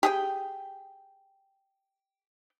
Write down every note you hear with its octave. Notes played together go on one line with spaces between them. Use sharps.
G4 G#4 G5